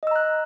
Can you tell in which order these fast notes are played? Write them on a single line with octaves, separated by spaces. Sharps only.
D#5 E6 A#5 F#6